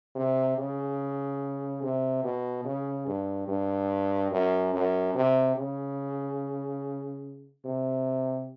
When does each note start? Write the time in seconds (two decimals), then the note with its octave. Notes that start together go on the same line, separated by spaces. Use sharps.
0.15 C3
0.57 C#3
1.82 C3
2.24 B2
2.65 C#3
3.07 G2
3.48 G2
4.31 F#2
4.74 F#2
5.15 C3
5.56 C#3
7.65 C3